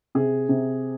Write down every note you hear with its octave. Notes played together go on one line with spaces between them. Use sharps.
C3 G#4
C3